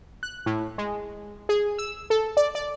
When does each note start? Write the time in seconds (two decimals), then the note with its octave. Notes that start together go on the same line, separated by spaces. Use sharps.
0.23 F#6
0.46 A2
0.78 G#3
1.49 G#4
1.78 E6
2.10 A4
2.37 D5
2.55 D5